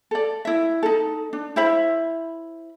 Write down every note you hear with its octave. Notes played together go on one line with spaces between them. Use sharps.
A4 D5
E4 E5
D#4 A4
D4
E4 C5 E5 B5